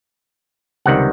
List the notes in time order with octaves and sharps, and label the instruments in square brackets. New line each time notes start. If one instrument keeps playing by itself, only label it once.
[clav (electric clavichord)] C#2 C3 D#3 G3 F#5